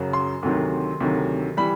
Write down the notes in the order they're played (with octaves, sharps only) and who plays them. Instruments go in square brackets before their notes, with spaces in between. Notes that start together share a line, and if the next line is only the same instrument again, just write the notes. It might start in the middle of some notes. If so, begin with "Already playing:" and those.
Already playing: [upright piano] F#2 C#3 F#3
C6
D2 C3 D#3 F#3
D2 C3 D#3 F#3
E3 G3 B5